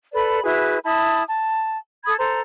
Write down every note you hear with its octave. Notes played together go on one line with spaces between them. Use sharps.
A4 B4 D5 B5
E4 F#4 G#4 B4
E4 A5 B5 D#6
A5
A4 B5 D#6 G#6
A4 C5 A#5